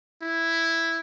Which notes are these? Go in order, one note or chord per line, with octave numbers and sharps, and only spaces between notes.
E4